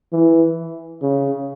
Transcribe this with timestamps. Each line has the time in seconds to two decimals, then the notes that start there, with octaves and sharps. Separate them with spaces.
0.13 E3
1.03 C#3